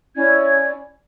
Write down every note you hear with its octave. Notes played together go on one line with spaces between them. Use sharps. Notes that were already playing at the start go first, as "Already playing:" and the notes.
C#4 E4 D5 G#6